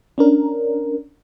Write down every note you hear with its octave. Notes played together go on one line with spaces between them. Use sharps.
C#4 D4 A#4